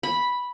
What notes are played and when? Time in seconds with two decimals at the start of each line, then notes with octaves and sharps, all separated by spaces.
0.03 B5